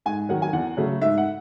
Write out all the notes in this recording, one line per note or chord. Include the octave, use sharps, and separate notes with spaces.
G#2 G#5
D#3 F#3 F#5
G#5
E2 F#5
C#3 F#3 A3
G#2 E5
F#5